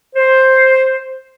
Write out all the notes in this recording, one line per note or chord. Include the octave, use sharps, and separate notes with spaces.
C5